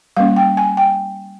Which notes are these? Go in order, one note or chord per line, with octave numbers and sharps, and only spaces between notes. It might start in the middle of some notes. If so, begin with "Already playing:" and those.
G3 A#3 C#4 F5
G5
G#5
G5